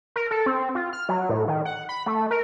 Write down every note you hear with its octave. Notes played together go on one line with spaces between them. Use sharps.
A#4
A4
C4
F4
F6
F#3
A2
D#3
F#5
B5
A3
A#4